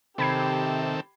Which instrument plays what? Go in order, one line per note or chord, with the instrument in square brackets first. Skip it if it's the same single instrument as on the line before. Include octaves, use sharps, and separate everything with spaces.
[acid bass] C3 [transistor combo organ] D#3 C4 A4 [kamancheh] G4 [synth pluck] B5 G#6 C7